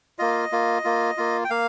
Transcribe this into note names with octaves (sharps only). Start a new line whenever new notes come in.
A#3 F4 D#5
A#3 F4
A#3 F4
A#3 F4
G5
A#3 F5